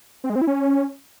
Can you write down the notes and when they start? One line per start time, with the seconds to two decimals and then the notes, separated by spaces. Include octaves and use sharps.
0.24 C4
0.30 G#3
0.36 C4
0.41 E4
0.47 C#4